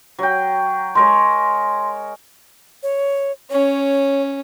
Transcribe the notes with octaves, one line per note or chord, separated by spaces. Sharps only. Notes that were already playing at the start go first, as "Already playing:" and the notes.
F#3 G5
G#3 A#4 C#5 C6
C#5
C#4 C#5